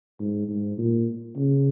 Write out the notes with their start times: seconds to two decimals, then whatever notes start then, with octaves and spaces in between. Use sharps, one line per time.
0.19 G#2
0.48 G#2
0.78 A#2
1.36 C#3